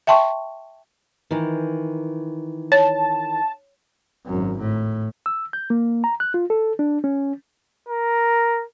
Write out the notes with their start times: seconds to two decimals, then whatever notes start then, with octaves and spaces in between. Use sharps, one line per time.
0.07 E5 G5 A5 C6 C#6
1.31 D#3 E3
2.72 C#5 A5
4.26 G#1 F#2
4.58 A2
5.26 E6
5.53 G6
5.70 A#3
6.04 A#5
6.20 F#6
6.34 F4
6.50 A4
6.79 D4
7.04 C#4
7.89 A#4